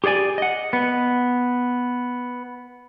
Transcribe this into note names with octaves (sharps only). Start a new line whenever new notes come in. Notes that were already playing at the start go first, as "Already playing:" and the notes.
G4 G#4 C#5 D5 G#5
D#5 F#5
B3